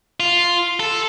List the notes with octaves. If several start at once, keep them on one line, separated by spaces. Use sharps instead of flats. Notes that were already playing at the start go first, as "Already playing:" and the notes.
F4
A4